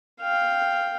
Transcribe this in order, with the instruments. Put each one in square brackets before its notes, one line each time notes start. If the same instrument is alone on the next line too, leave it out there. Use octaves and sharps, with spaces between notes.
[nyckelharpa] F5 G5